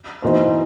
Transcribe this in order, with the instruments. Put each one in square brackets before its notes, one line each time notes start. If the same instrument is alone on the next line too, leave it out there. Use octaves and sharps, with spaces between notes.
[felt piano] E3 B3 D#4 F#4 C5